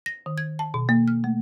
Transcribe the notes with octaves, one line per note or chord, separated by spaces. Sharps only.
A#6
D#3
G#6
A5
B2
A#3
F6
A3